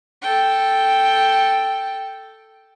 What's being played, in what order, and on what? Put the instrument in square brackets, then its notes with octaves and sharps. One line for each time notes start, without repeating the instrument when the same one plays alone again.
[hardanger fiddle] A4 G5